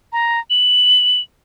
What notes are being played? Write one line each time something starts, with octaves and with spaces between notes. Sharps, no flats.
A#5
F#7